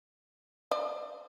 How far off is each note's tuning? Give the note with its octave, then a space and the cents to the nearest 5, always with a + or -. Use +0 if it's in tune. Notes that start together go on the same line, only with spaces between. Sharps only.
D5 +30